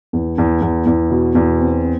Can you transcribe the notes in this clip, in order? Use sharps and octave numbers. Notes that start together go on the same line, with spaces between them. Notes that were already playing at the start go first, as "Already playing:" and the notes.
E2
E2
E2
E2
B2
E2
C4
C4